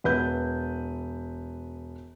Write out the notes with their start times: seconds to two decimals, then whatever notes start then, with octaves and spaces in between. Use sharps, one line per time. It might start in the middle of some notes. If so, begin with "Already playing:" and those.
0.04 E1 B4 G6